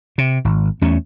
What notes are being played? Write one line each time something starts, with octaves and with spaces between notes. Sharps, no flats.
C3
G#1
E2 A3 C#4